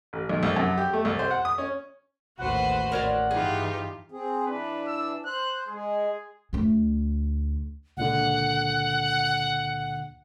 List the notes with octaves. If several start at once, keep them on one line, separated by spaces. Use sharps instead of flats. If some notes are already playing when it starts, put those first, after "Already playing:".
A1
B1
C2
F#2
G4
A3
C2
C5
F#5
D#6
C#4
A1 D#2 F#4 B4 C5 F#5
A1 A#4 C#5 D5
G2 E3 D#4 F4 G4 G#4
C4 G#4
E3 D4 B4
E6
C5 F#6
G#3 G#4
D2 D3
C#2 A#2 D3 F#5